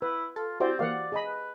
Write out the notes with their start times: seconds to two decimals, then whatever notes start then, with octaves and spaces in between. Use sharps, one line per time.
0.02 E4 B4
0.36 F4 A4
0.60 C4 E4 F#4 G4 C5 D5 G5
0.79 E3 A#3 F#4 D5 F5 F#5
1.12 G#4 D#5 B5
1.25 B4